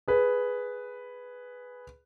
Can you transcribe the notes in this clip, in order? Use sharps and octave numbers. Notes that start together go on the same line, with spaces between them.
G#4 B4